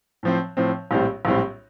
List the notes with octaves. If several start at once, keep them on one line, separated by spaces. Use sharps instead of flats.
A2 F3 C4
A2 F3 C4
A#1 A2 G3 C4
A#1 A2 G3 C4